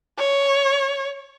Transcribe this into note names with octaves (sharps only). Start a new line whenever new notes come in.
C#5